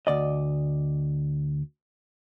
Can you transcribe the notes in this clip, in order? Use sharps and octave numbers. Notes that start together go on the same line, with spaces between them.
D2 D5 D#5